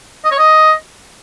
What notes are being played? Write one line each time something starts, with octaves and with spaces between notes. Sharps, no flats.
D#5
C#5
D#5